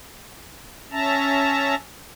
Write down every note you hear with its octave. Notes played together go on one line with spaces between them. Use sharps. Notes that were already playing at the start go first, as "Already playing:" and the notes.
C#4 E5 A5 A#5